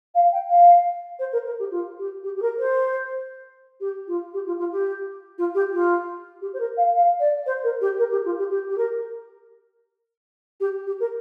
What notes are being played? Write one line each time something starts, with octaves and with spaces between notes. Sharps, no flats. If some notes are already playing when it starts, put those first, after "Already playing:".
F5
G5
F5
C5
A#4
A#4
G4
F4
G4
G4
G4
A#4
C5
G4
F4
G4
F4
F4
G4
F4
G4
F4
G4
C5
A#4
F5
F5
D5
C5
A#4
G4
A#4
G4
F4
G4
G4
G4
A#4
G4
G4
A#4